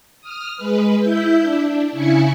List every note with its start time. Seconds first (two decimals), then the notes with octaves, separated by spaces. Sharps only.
0.21 D#6 F6
0.57 G#3 B4
1.00 E4 E5 G6
1.42 D4
1.92 C#3 E4 G#5 C#7